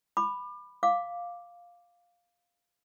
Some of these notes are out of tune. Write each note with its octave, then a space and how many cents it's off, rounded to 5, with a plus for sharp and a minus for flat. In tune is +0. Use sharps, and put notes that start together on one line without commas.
B5 +0 D6 +35
F5 +5 D6 +0